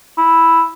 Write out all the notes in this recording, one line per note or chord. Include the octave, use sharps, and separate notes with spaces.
E4